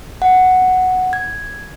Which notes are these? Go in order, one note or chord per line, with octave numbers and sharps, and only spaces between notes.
F#5
G#6